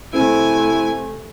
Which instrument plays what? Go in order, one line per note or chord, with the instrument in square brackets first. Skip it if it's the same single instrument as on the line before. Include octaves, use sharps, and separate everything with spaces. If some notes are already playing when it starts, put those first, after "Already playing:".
[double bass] C3 A3 [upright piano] C4 [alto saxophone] E4 [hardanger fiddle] G#5